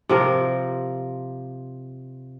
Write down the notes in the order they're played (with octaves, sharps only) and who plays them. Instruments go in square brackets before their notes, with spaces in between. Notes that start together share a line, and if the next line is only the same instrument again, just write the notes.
[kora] C3 F3 A#4